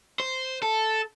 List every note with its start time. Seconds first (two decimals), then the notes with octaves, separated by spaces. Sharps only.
0.20 C5
0.62 A4